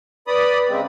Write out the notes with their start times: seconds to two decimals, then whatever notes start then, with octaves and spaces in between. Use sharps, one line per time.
0.27 B4 D5 B5 D#6
0.69 C#3 G#3 C4